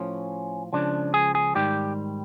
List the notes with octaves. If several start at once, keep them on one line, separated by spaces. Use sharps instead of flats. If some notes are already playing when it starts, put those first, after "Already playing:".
Already playing: A2 F3 C#4
C#2 C#3 F3 D4
G#4
G#4
G#2 D#3 G3 G4